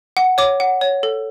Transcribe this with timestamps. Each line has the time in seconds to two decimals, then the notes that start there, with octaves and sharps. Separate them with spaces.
0.17 F#5
0.38 C#5 D6
0.60 F#5
0.81 C#5
1.03 A4